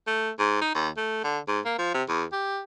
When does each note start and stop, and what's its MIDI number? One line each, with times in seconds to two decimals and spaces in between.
0.07 0.30 57
0.39 0.61 44
0.61 0.71 63
0.75 0.88 39
0.97 1.19 57
1.24 1.39 50
1.48 1.60 44
1.65 1.75 58
1.79 1.91 53
1.94 2.03 48
2.09 2.24 40
2.32 2.61 67